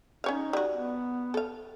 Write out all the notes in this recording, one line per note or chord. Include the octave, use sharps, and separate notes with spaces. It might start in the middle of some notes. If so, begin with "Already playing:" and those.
C#4 D#4 C#5 F5
G3 F#4
B3
A4 F5